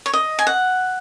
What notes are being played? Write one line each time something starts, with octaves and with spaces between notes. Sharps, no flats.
C#5
D#5
G#5
F#5